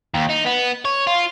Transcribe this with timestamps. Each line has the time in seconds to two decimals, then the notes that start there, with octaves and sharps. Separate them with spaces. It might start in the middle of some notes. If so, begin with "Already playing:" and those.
0.14 D#2
0.30 D#4
0.46 B3
0.85 C#5
1.07 F4